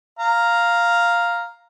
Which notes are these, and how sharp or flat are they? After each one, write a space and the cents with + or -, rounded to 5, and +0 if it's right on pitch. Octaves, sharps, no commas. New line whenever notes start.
F5 +0 A#5 +0